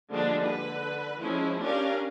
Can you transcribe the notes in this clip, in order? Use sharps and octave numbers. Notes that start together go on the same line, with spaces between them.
D3 F3 G3 G#3 A#3 D4
D3 B4
F3 G#3 C#4 E4
C#4 D4 G4 A#4 F5